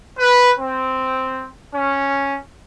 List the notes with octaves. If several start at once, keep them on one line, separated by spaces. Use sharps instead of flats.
B4
C4
C#4